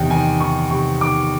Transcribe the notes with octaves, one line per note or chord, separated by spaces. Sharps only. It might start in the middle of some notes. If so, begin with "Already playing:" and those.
Already playing: E2 C3 D#3 G5
D#3 G#5
D#3 C#6
C3 C#6
D#3 D6